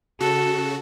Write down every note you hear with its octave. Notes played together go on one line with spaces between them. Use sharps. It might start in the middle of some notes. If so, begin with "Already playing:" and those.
C#3 F#4 A4